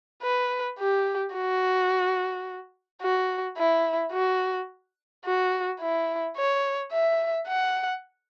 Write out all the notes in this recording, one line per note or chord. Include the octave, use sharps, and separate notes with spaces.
B4
G4
F#4
F#4
E4
F#4
F#4
E4
C#5
E5
F#5